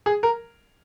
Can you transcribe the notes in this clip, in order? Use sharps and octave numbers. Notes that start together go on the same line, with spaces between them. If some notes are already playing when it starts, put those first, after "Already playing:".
G#4
A#4